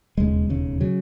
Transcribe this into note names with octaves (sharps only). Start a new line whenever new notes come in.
E1 D#2 C#3 G#3
E1 D#2 C#3
C#3 F#3